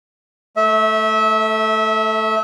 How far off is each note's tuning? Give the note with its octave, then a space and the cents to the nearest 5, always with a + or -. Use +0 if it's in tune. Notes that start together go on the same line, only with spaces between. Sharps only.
A3 +0 E5 -25